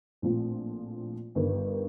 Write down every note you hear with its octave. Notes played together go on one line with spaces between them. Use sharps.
A#1 A2 F3 C4 F4
G1 G2 D#3